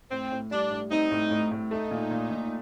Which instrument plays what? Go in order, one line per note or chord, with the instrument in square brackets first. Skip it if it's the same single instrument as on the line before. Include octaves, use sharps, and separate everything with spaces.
[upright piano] A2 [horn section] C4
[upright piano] A2
[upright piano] G3 [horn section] D4
[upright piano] A2
[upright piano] C4 [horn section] D#4
[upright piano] A2
A2
A2
[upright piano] A3 [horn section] D#4
[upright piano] A#2
A#2
A#2